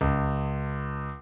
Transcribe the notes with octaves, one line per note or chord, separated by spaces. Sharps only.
C#2